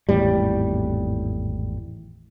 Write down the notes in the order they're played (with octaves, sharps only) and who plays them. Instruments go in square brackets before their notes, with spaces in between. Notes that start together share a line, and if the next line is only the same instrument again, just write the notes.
[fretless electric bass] G#1 E2 A2 G3